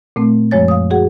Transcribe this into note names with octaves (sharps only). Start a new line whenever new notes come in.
A#2 A3 C4
F#2 F3 G#3 C#5 A6
F5 D#6
F#4 G#4 F#5